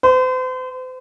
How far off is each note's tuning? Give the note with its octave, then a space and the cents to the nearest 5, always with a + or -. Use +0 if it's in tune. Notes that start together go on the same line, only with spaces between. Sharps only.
C5 -40